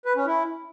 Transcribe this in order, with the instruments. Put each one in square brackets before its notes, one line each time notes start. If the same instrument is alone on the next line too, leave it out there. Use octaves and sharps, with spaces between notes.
[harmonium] B4
C#4
E4